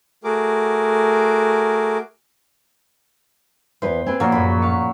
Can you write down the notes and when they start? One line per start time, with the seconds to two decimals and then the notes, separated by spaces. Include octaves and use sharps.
0.24 A3 F#4 G#4 A#4 D6
3.82 E2 B4 C5
4.06 C4 G#4 B4
4.20 A#2 F3 F#3 A#3 C#4 A#4
4.32 F#2 A2 B5
4.61 F5 C#6 B6